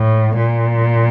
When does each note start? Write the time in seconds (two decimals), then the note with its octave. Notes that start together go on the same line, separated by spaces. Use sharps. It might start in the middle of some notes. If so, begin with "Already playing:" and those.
Already playing: A2
0.36 A#2